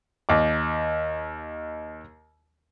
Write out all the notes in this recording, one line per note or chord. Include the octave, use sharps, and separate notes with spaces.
D#2 D6